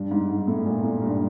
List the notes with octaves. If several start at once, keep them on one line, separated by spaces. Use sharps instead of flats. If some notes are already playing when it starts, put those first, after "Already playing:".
Already playing: G2
G#2
G#2
A2
A#2
A2
G2